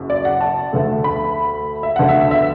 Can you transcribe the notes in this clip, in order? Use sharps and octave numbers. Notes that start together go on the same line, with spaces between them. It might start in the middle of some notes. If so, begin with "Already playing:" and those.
Already playing: F#1 F#2
D5
F#5
A5
D2 D3 A3
B5
E5
D2 D3 B3 D4 F#5
E5
E5